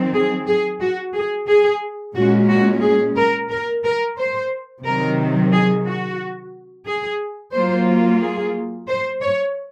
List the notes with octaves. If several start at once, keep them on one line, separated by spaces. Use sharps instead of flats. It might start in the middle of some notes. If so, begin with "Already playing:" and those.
Already playing: D#3 F#3 C4
G#4
G#4
F#4
G#4
G#4
A#2 G#3 C#4 F#4
F#4
G#4
A#4
A#4
A#4
C5
C3 D#3 F#3 A#4
G#4
F#4
G#4
F#3 A#3 F4 C5
G#4
C5
C#5